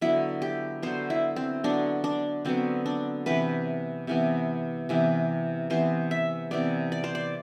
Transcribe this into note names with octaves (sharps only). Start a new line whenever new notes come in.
D3 F#3 B3 E4
G4
D3 F#3 B3 C5
E4
C4
D3 F#3 B3 D4
D4
D3 F#3 B3 C4
D4
C3 E3 B3 B4
C3 E3 B3
C3 E3 B3
C3 E3 B3 C5
E5
C3 E3 B3 D5
D5
C5
D5